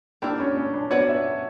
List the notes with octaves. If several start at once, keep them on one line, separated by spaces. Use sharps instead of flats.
A#3 D4 E4 G4
C#4
C#4
D4
B3 F#4 B4 C#5 D5
E5